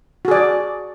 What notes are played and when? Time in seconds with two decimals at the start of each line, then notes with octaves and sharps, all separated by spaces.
0.25 F#4
0.28 G#4
0.31 D5